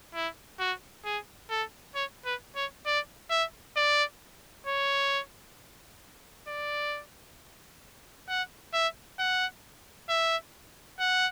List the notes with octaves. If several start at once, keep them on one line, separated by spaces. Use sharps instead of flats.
E4
F#4
G#4
A4
C#5
B4
C#5
D5
E5
D5
C#5
D5
F#5
E5
F#5
E5
F#5